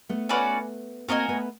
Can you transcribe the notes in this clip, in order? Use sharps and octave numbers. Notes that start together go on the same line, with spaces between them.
A3 B3
C#4 F#4 B4 D5
A#3 C4 F#4 A#4 D#5 G#5
A3 B3